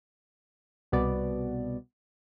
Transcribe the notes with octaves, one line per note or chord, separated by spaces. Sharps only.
C2 B2 B3 D5